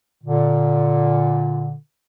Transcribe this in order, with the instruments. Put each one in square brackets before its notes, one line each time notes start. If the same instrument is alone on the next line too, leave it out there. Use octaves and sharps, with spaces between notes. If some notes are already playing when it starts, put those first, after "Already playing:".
[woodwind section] A#2 D3